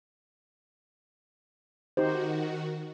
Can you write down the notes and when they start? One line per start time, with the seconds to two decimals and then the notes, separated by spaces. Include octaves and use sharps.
1.97 D#3 D#4 F#4 G4 C5